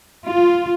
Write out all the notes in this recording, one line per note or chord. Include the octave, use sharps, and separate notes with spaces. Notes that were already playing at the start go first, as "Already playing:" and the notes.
F4